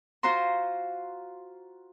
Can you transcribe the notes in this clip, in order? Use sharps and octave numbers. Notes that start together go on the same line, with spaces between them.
F4 F#4 C5 A#5 C6